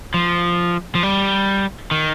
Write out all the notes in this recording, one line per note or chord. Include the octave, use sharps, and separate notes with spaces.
F3
F3
G3
D#3